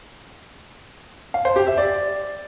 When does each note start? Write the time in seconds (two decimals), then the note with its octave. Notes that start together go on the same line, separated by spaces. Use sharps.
1.34 F5
1.45 C5
1.56 G4
1.67 E5
1.78 D5